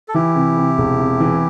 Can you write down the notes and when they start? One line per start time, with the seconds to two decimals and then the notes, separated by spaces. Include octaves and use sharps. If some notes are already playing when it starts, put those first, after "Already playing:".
0.08 A4
0.14 E3 E4 G4
0.35 C3
0.57 C3
0.78 E1
0.99 C3
1.20 E3